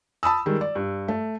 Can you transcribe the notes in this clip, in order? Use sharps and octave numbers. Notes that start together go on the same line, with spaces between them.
A5 B5 D#6 E6
D#3 G3 G#3
D5
G2
A3